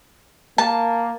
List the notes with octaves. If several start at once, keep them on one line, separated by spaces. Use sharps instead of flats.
A#3 A5